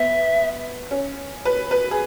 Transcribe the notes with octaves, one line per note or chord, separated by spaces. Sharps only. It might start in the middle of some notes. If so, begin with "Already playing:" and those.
Already playing: B3 E5
C#4
B4
B4
G#4